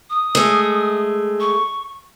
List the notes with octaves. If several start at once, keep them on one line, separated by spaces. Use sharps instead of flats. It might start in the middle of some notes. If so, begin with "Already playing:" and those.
D#6
G#3 A3
C#6